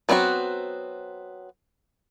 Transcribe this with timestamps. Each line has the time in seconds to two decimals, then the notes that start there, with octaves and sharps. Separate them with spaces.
0.09 F#3 B3 C4 D#4 F#4